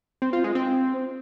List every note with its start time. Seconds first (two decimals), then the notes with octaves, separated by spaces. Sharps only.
0.22 C4
0.33 F4
0.44 G#3
0.55 C4